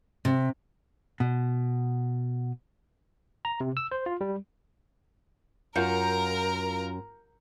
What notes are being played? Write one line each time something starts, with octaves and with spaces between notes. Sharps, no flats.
C3
B2
A#5
C3
E6
C5
F4
G3
F#2 F4 A#4 A#5 G6 C#7